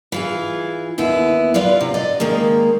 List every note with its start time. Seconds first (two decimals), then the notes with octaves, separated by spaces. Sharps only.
0.12 E3 F4 G#4
0.98 D#2 B3 E4
1.54 F4 B4 D5 F5
1.81 C3
1.94 D5 D#5
2.20 D#3 G#3 A#3